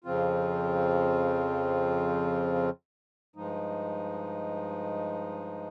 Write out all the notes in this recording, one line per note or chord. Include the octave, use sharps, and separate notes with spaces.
F2 C#3 F3 C4 F4
G2 F3 G#3 D#4